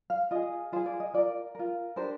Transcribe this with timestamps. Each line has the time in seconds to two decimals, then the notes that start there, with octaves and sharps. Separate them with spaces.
0.10 F5
0.31 F4 G#4 D#5
0.72 F4 C5
0.76 G#4
0.86 D5
1.00 D#5
1.14 F4 A#4 D5
1.55 F4 A#4
1.96 D4 G4 A#4 C5